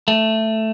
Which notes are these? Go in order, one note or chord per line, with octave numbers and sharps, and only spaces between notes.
A3